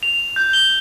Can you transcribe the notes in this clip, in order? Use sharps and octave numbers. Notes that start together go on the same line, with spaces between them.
F7
G6
G7